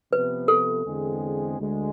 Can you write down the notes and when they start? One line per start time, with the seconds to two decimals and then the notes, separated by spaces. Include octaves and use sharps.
0.12 C3 F3 B3 B4
0.48 A4
0.85 E2 D3 G#3 C4 G#4
1.58 D2 D3 G#3